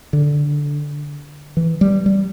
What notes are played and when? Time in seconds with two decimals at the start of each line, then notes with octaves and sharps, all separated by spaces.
0.13 D3
1.57 E3
1.81 G3
2.06 G3